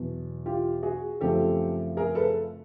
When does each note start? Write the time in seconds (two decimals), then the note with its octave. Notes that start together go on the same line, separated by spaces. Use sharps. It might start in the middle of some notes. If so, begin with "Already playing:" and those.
Already playing: E2 B2 F#3 B3
0.46 F4 G4
0.83 F#4 G#4
1.21 F#2 C#3 F3 A3 C4 G4 A4
1.97 G#4 A#4
2.15 A4 B4